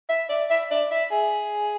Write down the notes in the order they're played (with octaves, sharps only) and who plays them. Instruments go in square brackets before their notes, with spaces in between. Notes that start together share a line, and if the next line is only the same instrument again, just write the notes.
[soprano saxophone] E5
D5
E5
D5
E5
G#4